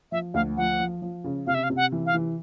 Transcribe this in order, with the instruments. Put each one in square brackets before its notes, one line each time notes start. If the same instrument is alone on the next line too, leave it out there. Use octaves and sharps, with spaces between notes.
[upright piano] F3 [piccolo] E5
[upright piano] D2 [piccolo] F5
[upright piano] F3 [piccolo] F#5
[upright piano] F3
F3
C#3
[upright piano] C3 [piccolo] F5
[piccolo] E5
F5
[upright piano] C3
[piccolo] F#5
[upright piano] E3
[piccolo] F5
[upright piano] E3